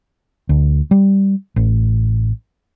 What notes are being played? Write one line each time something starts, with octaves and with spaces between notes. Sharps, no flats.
D2
G3
A1